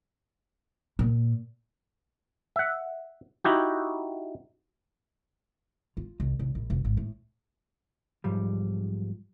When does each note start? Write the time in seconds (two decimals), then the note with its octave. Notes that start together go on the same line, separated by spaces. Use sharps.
0.99 A#2
2.56 E5 F#5
3.44 D#4 E4 F#4 G4
5.97 F4
6.20 C2
6.39 C2
6.55 A#1
6.70 F1
6.85 G#1
6.97 A2
8.24 B1 G#2 F3 G3